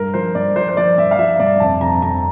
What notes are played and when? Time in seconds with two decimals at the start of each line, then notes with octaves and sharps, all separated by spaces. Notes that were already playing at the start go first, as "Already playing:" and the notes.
Already playing: G2 A#4
0.14 F3 C5
0.35 G2 D5
0.56 F3 C5
0.69 C5
0.77 F3 D5
0.97 G2 E5
1.11 F5
1.19 F3 E5
1.39 G2 D5
1.60 F2 A5
1.81 F2 A#5
2.02 F2 A#5